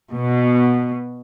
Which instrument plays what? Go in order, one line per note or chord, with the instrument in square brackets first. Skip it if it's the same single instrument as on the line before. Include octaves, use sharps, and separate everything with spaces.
[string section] B2